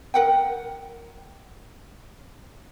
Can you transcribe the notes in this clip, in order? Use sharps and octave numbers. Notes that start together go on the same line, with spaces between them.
A#4 F#5 G5